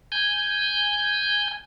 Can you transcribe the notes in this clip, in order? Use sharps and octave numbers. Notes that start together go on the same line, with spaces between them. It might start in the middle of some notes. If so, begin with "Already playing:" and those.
G#5 G6